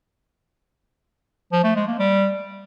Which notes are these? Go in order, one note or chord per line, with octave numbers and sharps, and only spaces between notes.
F3
A3
G#3
A#3
G3